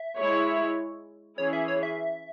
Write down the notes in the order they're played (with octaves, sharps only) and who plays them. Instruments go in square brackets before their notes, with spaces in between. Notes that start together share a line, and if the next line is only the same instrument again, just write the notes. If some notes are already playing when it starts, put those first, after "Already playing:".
Already playing: [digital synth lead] E5
[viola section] G#3 E4 C#5
[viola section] E3 C#4 E4 G#4 [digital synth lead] C#5
[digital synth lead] E5
C#5
E5